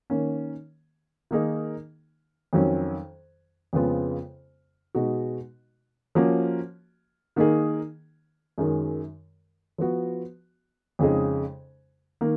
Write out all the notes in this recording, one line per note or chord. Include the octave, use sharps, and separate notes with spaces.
D#3 A#3 C#4
D#3 A#3 D#4 G#4
F2 D#3 F#3 C#4
F2 C#3 G#3 B3 F4
B2 G#3 D#4 F#4
F3 A#3 C#4 F#4
D#3 A#3 D#4 G#4
F#2 D#3 G#3
F3 B3 F#4
F2 C#3 G#3 D#4 G#4
D#3 A#3